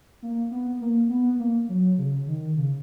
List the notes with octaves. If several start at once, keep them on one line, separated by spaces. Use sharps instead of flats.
A#3
B3
A#3
B3
A#3
F#3
C#3
D#3
C#3